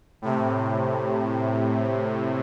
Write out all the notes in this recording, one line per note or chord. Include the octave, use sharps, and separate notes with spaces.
A2 C3